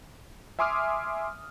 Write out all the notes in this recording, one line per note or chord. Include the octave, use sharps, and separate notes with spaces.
E5 G#5 C6 D6 D#6 F6